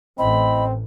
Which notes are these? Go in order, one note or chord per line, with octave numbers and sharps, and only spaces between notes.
A1 A2 C4 D#5 B5